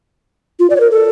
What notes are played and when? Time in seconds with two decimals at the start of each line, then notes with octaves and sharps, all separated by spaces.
0.60 F4
0.70 D5
0.76 C#5
0.80 A#4
0.91 A4